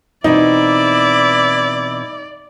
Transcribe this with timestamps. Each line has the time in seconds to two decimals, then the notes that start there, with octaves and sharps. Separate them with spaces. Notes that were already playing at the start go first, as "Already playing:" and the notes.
0.24 B2 E3 C4 D#4 E4 D5